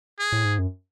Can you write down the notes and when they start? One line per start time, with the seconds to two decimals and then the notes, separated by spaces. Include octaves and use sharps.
0.19 G#4
0.32 A2
0.45 G#2
0.59 F#2